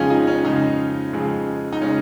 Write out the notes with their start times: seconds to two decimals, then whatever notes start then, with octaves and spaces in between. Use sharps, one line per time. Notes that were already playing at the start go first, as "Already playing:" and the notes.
Already playing: F2 C#3 G#3 C#4 D#4 F4 G#4
0.10 D#4
0.27 C#4
0.45 F2 C#3 G#3 D#4
1.13 F2 C#3 G#3
1.73 D#4
1.82 C#3 G#3 C#4